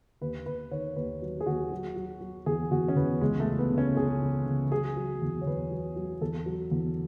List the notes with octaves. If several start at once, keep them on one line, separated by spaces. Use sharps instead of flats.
D#2 B4
D#2 B4
D#3 C#5
D#2 B4
F#3
G#4
D#2 F#4
F#3
F#3
F#3
E2 G#4
E2 F#4
C#4
E2 B3
C#2 G#3
A3
C#2
B3
C#3
C#4
C#2 G#4
C#3
C#3
F#3 G#4
F#3
E2
C#5
E2 B4
F#3
F#3
E2 A4
F#3
E2